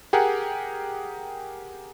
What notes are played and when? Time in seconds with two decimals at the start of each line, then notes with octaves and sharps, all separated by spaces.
0.13 G4 G#4 A#4 F#5